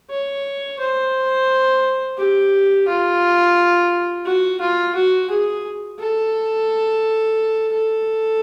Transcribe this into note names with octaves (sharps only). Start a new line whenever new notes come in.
C#5
C5
G4
F4
F#4
F4
F#4
G#4
A4
A4